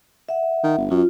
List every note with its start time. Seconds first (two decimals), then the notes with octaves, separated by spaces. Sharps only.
0.29 E5 F#5
0.64 D#3
0.78 G1
0.90 F#2 F4